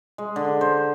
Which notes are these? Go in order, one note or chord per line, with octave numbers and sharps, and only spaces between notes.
G#3
D3
C5